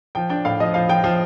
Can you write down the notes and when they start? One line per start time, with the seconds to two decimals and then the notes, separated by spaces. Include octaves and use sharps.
0.15 F3 G5
0.30 D4 G5
0.45 A2 F5
0.60 F3 D#5
0.74 F3 F5
0.89 F3 G5
1.04 F3